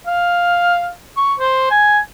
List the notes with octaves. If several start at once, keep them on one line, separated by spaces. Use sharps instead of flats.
F5
C#6
C5
G#5